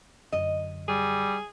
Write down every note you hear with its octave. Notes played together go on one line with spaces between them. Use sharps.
F#2 D3 D#5
G3 G#4